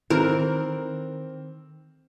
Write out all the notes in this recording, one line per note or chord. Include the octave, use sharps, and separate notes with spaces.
D#3 E3 C4 A#4